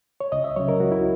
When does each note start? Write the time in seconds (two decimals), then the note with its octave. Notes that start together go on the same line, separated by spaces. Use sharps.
0.20 C#5
0.32 C#2 D#5
0.44 E5
0.56 C#3 F#3 C#5
0.68 A#4
0.80 C#2 F#4
0.92 E4